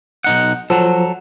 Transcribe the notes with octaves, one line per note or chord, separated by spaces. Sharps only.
B1 D#4 F#5
F3 F#3 A4